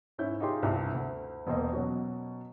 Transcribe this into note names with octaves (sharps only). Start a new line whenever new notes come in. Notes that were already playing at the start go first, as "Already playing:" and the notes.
G#2 C#4 E4 G6
D#4 F4 G4 G#4 C6
C2 G2
D2
E1 A#3 C5 D#5
B2 F#3 C#4 F#4